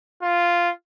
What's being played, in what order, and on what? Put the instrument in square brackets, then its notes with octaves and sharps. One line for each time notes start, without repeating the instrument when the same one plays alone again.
[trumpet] F4